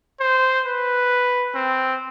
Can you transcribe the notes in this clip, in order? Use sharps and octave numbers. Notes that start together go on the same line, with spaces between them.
C5
B4
C4